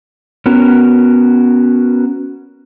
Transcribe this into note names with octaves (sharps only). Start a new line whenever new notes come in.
B3 C#4 F#4 A#4